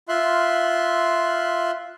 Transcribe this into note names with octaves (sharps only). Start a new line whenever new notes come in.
F4 E5 C6 F#6